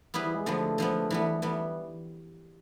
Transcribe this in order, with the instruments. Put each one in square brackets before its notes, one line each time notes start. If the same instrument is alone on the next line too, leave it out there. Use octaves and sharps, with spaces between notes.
[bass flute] E3 [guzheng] G3 B3 E4 G#4 B4
[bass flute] E3
G#3
[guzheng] D3 F3 G#3 B3 [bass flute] A3
[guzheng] D3 F3 G#3 B3
E3 G3 B3
E3 G3 B3